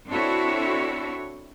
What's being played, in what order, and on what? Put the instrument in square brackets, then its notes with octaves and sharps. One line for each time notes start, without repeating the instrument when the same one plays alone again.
[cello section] C4 D4 E4 F#4 A4 C#5